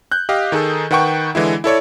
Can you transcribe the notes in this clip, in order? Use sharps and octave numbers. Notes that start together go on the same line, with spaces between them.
F#6 G6
G4 D#5 F5
D#3 D#4 G#4 A4
D#3 B4 F#5 G5 C#6
D3 E3 G#3 E4
E4 A4 C#5 D5